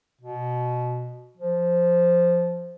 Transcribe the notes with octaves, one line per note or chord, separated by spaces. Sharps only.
B2
F3